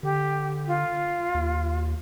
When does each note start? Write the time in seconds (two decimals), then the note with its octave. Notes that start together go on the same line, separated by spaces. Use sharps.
0.03 D3 G4
0.67 F4
1.34 D#2